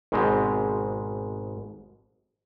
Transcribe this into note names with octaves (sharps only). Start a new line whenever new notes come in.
G#1 G#2 B2 G#3 C4 G4